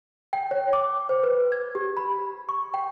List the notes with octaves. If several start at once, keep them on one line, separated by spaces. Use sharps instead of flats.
G5
C#5
D6
C5
B4
G#6
G4
B5
C#6
G5